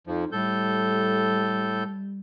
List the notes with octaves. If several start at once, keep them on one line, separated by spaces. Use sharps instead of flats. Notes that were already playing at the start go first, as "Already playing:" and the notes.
F2 F3 D#4
A2 G3 A4 G6